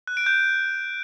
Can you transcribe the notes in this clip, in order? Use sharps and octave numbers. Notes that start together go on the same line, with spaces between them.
F#6
D7
G6